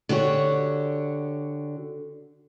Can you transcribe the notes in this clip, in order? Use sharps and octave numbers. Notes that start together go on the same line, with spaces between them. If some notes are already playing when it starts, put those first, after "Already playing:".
D3 F#4 G4 C#5